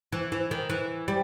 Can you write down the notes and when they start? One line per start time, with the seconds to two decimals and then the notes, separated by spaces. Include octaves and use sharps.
0.12 E3
0.32 E3
0.51 D#3
0.70 E3
1.08 G3